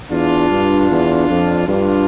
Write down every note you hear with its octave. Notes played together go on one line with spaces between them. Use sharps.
E2 D4 F4
G2
E2
F2
G2 D4 F4